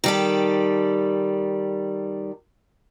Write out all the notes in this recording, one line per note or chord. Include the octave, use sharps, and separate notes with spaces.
D#3 G3 A4